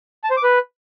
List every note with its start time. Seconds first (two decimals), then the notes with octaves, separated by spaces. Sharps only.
0.24 A5
0.30 C5
0.37 D6
0.43 B4